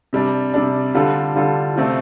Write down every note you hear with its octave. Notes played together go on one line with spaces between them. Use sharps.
C3 G3 D4
C3 G3 D4
D3 G3 F4 A4
D3 G3 F4 A4
C3 A3 C4 F4